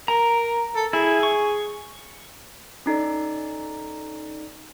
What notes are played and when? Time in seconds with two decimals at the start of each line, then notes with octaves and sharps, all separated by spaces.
0.08 A#4 A#5
0.76 A4
0.93 E4 G#4
1.23 C#6
2.86 C#4 D#4 A4 D5